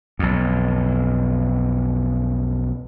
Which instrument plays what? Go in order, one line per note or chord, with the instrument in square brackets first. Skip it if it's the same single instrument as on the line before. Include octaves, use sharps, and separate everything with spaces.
[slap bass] B1 F2